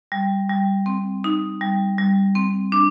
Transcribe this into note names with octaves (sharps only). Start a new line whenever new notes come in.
G3
G3
C4
D#4
G3
G3
C4
D4